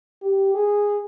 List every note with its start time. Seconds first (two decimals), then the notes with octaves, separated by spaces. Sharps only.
0.22 G4
0.54 G#4